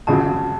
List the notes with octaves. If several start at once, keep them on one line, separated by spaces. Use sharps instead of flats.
G#1 F#2 C#3 F3 A5